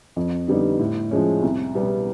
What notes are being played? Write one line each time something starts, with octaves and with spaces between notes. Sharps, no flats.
F2
D3 G3 B3 D#4
A2
F3 G#3 C#4
C2
B2 G3 B3